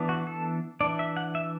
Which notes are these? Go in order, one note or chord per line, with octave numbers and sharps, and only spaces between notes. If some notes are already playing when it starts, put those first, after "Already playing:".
Already playing: E3 B3 D4
F#4
A4
E3 D4 D5
E5
F#5
E5